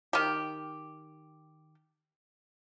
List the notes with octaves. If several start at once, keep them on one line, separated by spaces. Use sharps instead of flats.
D#3 G4